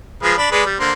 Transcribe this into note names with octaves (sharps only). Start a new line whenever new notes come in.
F3 G#3 B4
D4 B5
G#3 B4 D5
G3
D3 A#3 C5